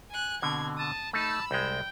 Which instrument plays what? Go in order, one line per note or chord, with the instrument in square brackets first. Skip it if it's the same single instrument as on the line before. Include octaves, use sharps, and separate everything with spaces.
[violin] G#5 F#6
[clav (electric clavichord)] B2 D3 [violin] C4 G#6
[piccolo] A5 [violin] D#6
[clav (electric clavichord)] A3 D#4 [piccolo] A5 [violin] B5 E6
[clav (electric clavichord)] C2 G#3 [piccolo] G5